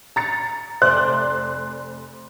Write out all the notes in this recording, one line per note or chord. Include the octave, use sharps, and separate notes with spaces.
A#5 A6 C#7
F1 C5 D5 F#6